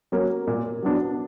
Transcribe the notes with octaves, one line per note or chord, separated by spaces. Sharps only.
F#3 A#3 C#4
A#2
F#3 B3 D4